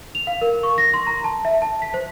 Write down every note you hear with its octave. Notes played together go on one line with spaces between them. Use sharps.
F7
F5
A#4
C#6
A#6
C6
A#5
A5
E5
A5
B6
C5